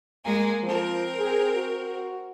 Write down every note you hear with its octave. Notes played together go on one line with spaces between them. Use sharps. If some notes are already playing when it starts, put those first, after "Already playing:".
G#3 A#3 G#5
F3 C4 A#4
G#4
F#4